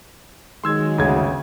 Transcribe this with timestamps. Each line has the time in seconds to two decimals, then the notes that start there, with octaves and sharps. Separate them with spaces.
0.64 D#3 F#3 G#3 C6 E6 G#6
0.98 G1 D2 C#3 G#6